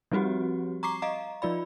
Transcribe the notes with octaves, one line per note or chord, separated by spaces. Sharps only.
F3 G3 C4 F#4 G4
A#5 C#6 D6 C7
D#5 F5 A#5
F3 F4 D5 B5